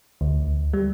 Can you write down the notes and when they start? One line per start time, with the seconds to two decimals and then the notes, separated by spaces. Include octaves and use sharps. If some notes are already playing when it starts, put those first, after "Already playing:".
0.21 D2
0.73 G3